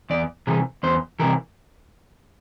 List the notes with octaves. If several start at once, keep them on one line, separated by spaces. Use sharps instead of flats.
E2 D5
C3 E3 G#4
E2 C5
C3 E3 A#4